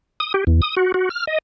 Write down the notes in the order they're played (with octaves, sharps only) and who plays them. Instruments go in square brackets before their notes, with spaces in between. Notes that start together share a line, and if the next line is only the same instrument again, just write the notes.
[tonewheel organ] D#6
G4
E2
D#6
F#4
F#4
F6
D#5